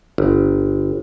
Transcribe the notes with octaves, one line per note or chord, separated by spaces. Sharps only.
G1